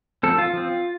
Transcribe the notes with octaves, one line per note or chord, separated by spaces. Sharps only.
F3 C4 A4
F4
F3 C4